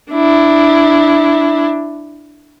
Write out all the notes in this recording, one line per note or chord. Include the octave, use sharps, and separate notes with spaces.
D4 E4